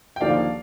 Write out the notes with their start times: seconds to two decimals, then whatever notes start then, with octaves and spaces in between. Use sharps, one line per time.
0.16 G5
0.21 D#2 D3 F3 A#3 D5 F5